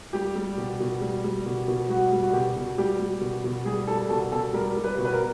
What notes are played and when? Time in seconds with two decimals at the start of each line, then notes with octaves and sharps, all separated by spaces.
0.13 G3 G4
0.36 G3
0.58 B2
0.80 B2
1.02 G3
1.24 G3
1.46 B2
1.68 B2
1.89 G3 F#4
2.12 G3
2.23 F#4
2.33 B2 G4
2.56 B2
2.78 G3 G4
3.00 G3
3.21 B2
3.44 B2
3.65 G3 G#4
3.87 G3 A4
4.09 B2 A4
4.31 B2 A4
4.54 G3 A#4
4.76 G3
4.84 B4
4.98 B2
5.04 B4
5.13 A#4